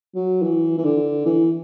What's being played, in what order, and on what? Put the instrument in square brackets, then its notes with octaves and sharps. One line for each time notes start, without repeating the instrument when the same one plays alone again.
[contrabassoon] F#3
E3
E3
D3
E3